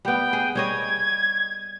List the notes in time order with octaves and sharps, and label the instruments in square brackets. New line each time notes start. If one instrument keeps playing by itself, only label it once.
[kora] G3 B3 [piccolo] G5
[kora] G#4
[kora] G3 C#5 D#5 [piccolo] G#6